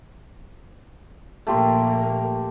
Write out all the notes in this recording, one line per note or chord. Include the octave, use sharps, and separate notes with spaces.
A#1 A3 A#3 G4 C6